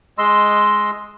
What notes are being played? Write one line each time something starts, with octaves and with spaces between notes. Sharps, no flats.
G#3 D#5 C6 E6